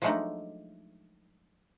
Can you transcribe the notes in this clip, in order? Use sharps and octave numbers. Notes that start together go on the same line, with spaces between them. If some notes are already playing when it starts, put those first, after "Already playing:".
F3 F#3 G#3 A3 D4 D#4